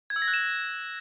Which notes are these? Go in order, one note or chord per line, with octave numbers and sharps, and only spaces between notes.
G#6
E6
A#6
F#6
E7